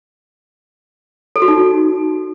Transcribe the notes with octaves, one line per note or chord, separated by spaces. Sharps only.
A4
F#4
D#4